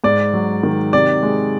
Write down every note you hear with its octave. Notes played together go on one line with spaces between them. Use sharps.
G#2 D5
F#3
D#3
C3 D5
G#3